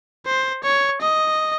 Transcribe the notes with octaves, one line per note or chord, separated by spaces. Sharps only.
C5
C#5
D#5